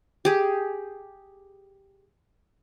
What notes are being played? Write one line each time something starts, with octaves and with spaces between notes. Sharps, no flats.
G4 G#4